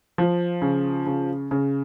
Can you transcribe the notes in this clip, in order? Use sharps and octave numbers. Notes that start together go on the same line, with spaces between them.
F3
C#3
C#3
C#3